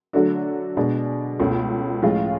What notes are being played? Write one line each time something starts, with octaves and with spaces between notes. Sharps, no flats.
D3 F#3 A3 D4 F#4
B2 G#3 D4
C#2 B2 A3 C#4
A2 F3 G#3 C#4 F4